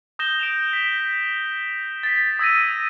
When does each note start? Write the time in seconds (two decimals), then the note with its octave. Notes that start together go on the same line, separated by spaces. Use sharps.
0.19 D#6 G6 A#6 E7 G7
0.39 D7 E7 F7
0.73 B6
2.03 A6 B6
2.39 D#6 E6 G#6 A#6 D#7